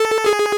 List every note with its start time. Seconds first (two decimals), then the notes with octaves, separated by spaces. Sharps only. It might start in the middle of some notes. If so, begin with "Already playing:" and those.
Already playing: A4
0.26 G#4